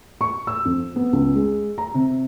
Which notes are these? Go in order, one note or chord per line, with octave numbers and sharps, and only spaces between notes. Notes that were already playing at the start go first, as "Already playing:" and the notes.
C#6
E6
F2
B3
C#2
G#3
A#5
C3